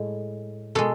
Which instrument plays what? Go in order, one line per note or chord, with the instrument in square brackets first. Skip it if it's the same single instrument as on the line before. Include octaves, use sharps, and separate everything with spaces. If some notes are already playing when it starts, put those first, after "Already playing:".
Already playing: [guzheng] A2 G#3
B2 G#3 A4